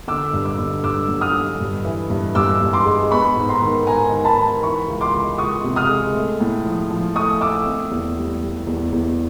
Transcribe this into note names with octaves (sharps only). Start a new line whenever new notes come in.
D3 D6 E6
G2
D6 E6
D3
G2 D6 E6
F#3
D#6 F6
D3
G2
E3
G2
G2 D6 E6
G2
C6 D6
G#3
B3 B5 C#6
G#2
A#5 C6
D#3
G#2 G#5 A#5
D#3
A5 B5
D#3
E3 B5 C#6
C#2
C6 D6
C#2
C#2 C#6 D#6
C3
D#6 F6
G#3
A3
A2
F3
F3
A3 C#6 D#6
A3 D6 E6
C4
E2
G3
G3
E2
E2